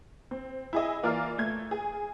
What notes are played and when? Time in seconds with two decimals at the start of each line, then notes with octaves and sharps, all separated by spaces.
0.31 C4
0.73 E4 G#4 D#5
1.03 E3 A#3 F4 A#4 D5 F6
1.38 A3 G#6
1.71 G#4